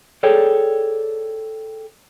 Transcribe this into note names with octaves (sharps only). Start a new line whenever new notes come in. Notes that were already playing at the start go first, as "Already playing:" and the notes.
G#4 A4 C#5 D5 G5